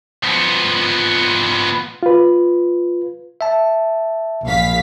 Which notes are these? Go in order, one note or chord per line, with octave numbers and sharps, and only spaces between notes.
F3 B3
F4 B4
E5 A5
A#1 F5 B6